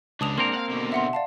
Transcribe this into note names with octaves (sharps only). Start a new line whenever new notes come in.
C#2 G#3 D4 A5 D#6 F7
A#3 C4 A#4 C6
F5 F#5
B2 D3
E5 F#5 C6
D5 F5 A5